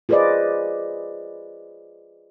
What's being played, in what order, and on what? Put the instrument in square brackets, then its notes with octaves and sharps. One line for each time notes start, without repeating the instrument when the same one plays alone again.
[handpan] F4 G#4 B4 C5 D5 D#5